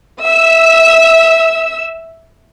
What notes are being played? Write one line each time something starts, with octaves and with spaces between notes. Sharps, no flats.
E5 E6